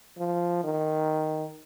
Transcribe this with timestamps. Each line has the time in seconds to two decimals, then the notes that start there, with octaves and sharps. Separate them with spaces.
0.18 F3
0.64 D#3